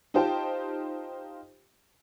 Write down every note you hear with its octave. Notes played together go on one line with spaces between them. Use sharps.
D#4 F4 G4 C5 G5 A5